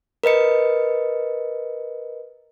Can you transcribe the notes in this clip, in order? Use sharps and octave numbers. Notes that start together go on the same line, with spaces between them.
A#4 B4 D#5 C#7